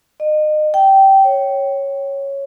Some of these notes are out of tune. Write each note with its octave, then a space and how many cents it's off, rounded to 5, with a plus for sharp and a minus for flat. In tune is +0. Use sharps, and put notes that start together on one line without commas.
D#5 -30
G5 -15
C#5 -5